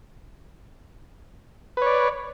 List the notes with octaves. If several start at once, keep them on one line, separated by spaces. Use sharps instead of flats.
B4 C#5 D5